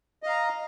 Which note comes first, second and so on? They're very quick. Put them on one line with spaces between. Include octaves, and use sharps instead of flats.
D#5 F5 A#5